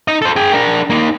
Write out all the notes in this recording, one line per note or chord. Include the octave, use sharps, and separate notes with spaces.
D#4 D#5
A4 C5
G#4 G5
D4 A#4
A#3 D#4